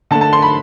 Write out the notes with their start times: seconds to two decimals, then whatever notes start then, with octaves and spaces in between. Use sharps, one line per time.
0.11 D3 A5
0.15 A3
0.21 A5
0.33 C6
0.42 B5